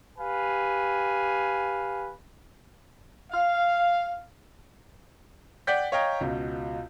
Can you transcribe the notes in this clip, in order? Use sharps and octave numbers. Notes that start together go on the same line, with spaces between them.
G4 B4 F5 G#5
F5
D5 F#5 G5 G6 B6
C#5 D#5 F5 G5 A#5
C#2 B2